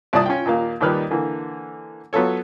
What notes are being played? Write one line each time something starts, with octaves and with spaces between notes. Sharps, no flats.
C2 A#2 D5 A5 D#6
C#4 F4 G5
D#2 A#2 A#3 F5
D#2 A#2 D#3 G3 B4 F6
D3 E3 A#3
F#3 B3 F4 A4 C#5